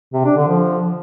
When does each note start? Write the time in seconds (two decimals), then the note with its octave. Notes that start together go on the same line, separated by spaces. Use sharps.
0.14 C3
0.25 D4
0.37 D3
0.48 F3